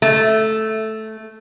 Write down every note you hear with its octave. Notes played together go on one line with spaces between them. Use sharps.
A3